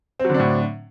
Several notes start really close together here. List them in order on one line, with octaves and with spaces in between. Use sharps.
C4 F#3 D3 D4 A2